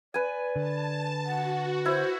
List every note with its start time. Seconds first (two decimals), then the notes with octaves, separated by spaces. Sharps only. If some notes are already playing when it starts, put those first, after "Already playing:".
0.14 B4 D5 G#5
0.56 D3 A5
1.26 F#4 F#5
1.86 E4 C5